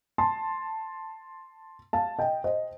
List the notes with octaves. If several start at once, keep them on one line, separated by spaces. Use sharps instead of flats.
A5 C6
F5 A5
D#5 G5
C5 D#5